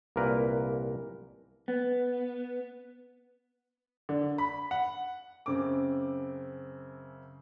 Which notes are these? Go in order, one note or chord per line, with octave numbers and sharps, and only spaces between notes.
C2 A#2 A#3 A#4 B4
B3
D3
B5
F#5
F#2 C#3 C4 D6